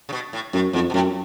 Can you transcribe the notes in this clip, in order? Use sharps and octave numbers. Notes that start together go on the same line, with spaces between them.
C#3
B2
A2
F#2 A2
F2 G#2
B2
F#2 A2